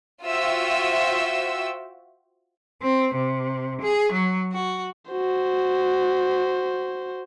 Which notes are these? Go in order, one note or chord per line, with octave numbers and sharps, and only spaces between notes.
F4 F#4 C5 E5 G5 E6
C4
C3
G#4
F#3
F#4
F#4 C5